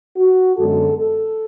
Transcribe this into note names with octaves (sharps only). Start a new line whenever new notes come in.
F#4
F#2 D3 G#3 B3 A4
A4